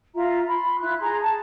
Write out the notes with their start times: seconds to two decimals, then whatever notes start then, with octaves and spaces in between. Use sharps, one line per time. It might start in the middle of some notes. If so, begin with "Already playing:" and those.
0.15 F4 E5 A#5
0.48 B5 C6
0.80 E4 F4 F#6
1.00 G#4 A#5 C6
1.21 A5